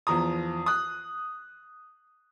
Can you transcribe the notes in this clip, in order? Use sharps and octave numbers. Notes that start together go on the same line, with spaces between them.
E2 F3 A#5 D#6
D#6 F#6